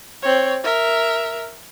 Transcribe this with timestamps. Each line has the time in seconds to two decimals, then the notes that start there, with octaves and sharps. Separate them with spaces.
0.22 C4 C#5
0.64 A#4 E5